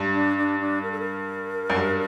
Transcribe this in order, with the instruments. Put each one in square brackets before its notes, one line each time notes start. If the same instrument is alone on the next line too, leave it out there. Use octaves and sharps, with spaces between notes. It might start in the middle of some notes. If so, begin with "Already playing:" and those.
Already playing: [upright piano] G2
[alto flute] D4
D4
D4
A#4
A4
A#4
[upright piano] F#2
G2